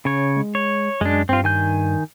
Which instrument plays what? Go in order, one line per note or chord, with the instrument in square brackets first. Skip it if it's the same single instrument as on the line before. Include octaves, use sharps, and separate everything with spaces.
[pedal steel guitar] C#3 C#5
[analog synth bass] G#3
[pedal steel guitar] C#5
[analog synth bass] F#2 [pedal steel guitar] G#3 D4
[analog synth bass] G2 [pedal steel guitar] C4 F4
[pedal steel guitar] D#3 G#5 G6